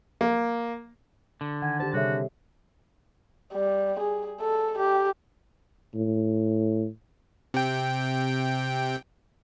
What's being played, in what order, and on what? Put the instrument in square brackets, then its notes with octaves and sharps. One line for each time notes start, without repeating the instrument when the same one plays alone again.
[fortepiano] A#3
[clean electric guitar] D3
[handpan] D#3 [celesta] F#5 [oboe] G#5
[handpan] G4 C5 [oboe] A5
[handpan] C3 G3 G#4 [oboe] F#4 [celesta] A4 C#5 E5
[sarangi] G3
G#4
A4
G4
[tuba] A2
[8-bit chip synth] C3 G5